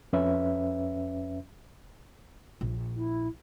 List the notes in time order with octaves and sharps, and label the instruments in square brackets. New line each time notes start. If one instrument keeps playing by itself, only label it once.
[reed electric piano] F2 C#4 B4 E5
[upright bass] A#1
[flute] E4